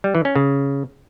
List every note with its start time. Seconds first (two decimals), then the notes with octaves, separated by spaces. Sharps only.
0.04 G3
0.15 E3
0.25 C#4
0.36 C#3